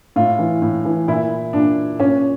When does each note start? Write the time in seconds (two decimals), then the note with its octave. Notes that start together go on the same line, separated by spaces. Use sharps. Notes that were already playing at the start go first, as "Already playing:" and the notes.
0.16 A2 F4
0.39 E3
0.62 A2
0.85 E3
1.08 A#2 E4
1.53 A#2 D4
1.99 A#2 C#4